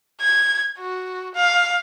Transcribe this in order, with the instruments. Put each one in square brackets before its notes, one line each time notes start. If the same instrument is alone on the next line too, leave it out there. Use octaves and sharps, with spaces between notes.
[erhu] G#6
F#4
F5